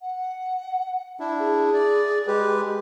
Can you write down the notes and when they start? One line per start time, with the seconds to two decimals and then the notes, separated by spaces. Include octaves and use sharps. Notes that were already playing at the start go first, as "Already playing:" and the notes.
0.01 F#5
1.20 D4 E4 E5
1.39 G#4
1.74 D5
2.27 G#3 G4 B4